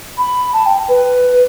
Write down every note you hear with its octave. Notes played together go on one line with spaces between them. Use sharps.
B5
A5
G5
B4